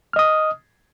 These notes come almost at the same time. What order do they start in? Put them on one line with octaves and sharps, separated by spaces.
F6 D#5 D#6